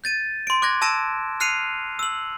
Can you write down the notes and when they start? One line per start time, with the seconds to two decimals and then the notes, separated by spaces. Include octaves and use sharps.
0.04 G6 A6 D#7
0.47 C6 D7
0.62 D6 F#6 G#6 A#6
0.82 A5 E6 A#6 D7 E7
1.40 F6 F#6 C7 C#7 D#7 F7
1.99 E6 F#7